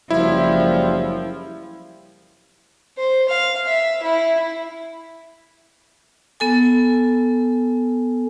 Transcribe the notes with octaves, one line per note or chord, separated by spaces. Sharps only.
F#1 F3 G3 E4
C5
F5
E5
E4
B3 A4 G#5